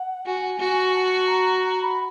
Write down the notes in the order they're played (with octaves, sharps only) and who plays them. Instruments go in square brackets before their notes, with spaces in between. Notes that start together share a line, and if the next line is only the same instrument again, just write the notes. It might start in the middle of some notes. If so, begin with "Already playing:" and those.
Already playing: [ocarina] F#5
[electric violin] F#4 [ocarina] G#5
[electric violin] F#4
[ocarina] A5
A#5
A#5
B5